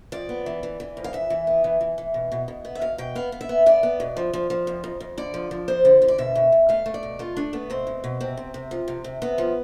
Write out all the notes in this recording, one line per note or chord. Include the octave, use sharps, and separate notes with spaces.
F2 D5
B3
E3
E3
E3
F2
F5
E3 E5
E3
B3
E3
E3
E3
B2
B2
B2
B3
E5
B2 F5
B2 G5
B3 F5
B3
E5
B3
B3 D5
B3
B2
F3
F3
F3
F2
F2
F2
D3 D5
F3
F3
F2 C5
D3
D3
D5
B2 E5
B2
B2
A3 F5
A3
D5
B2
A3 F4
A3 D4
A3 B3
B2 C4
B2
B2
C3 C4
C3
C3
F3
C3
C3
C3 B3
F3